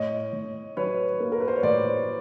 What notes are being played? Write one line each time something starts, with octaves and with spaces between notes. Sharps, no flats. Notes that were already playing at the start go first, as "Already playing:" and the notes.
Already playing: A2 C#5 D#5
A2
F#3 B4 C#5
A#3
A#4
B4
C5
C#5
A2 C5 D5